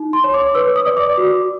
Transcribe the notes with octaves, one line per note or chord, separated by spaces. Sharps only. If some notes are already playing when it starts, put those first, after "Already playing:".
Already playing: D#4
C6
C#5
D6
B4 E6
D#6
D5
D6
F#4